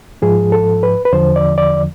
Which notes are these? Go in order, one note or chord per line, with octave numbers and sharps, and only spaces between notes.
G#2 F3 G#4
A4
B4
B4
E2 D3 F3 C5
D5
D5